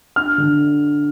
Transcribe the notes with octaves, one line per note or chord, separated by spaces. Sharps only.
D4 F6
D3